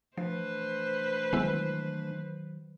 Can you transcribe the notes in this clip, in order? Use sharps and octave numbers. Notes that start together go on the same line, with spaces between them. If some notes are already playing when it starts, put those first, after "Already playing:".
E3 F3 A3 D4 B4 C5
D#3 F#3 G#3 B3 E4